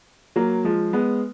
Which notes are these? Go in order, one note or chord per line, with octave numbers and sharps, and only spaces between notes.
F#3 A#3
F3 G#3
G#3 B3